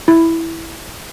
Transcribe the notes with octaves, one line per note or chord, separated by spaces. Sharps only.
E4